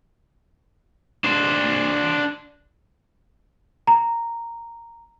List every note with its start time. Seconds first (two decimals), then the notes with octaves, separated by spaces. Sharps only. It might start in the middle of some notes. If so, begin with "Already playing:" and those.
1.24 D4 C5
3.87 A#5